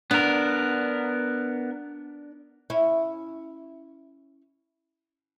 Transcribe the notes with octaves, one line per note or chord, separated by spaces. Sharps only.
B3 D4 A#4
C#4 E4